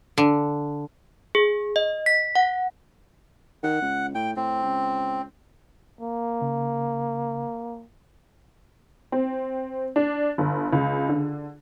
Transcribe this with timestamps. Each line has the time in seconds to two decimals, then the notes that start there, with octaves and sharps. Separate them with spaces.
0.18 D3
1.35 G#4
1.76 D#5
2.06 B6
2.35 F#5
3.63 D#3 F#5
3.81 C#2
4.15 A2 G5
4.36 A2 C4
4.63 C#2
6.01 A#3
6.41 C#3
9.12 C4
9.96 D4
10.38 G1
10.73 C#2
11.09 D3